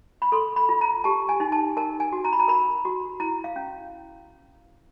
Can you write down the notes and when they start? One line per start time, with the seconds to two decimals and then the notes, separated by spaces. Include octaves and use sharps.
0.22 B5
0.32 A4 C6
0.56 B5
0.69 F4
0.81 A#5
1.04 G4 A5
1.29 G#5
1.40 D#4
1.52 A5
1.77 A#4 A5
2.00 G#5
2.12 F#4
2.25 A#5
2.33 B5
2.40 A#5
2.48 A#4 B5
2.85 F#4
3.20 E4 A#5
3.44 F5
3.56 C#4